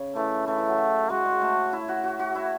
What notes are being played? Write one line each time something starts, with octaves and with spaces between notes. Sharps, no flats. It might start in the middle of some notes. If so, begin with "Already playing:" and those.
Already playing: C#3
E3 A3
E3 A3
E3
F#3
G#3 F#4
G#3
A3
E4
F#4
F#4
F#4
E4